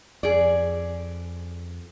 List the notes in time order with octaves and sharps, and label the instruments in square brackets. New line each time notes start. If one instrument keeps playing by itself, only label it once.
[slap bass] F2 [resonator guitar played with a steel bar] G#4 D5